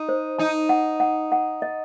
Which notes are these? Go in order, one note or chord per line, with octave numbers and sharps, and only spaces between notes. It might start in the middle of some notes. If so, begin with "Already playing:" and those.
Already playing: D#4
C5
D#4 A5
F#5
F#5
F#5
D#5